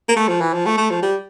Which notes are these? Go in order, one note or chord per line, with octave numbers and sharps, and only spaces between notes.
A#3
A3
F3
E3
F3
A3
A3
F3
G3